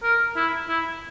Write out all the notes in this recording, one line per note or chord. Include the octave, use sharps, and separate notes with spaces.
A#4
E4
E4